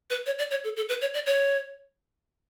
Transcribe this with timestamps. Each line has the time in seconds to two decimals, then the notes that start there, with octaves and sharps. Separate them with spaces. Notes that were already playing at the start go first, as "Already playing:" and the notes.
0.10 B4
0.26 C#5
0.39 D5
0.51 C#5
0.64 A4
0.77 A4
0.89 B4
1.01 C#5
1.14 D5
1.26 C#5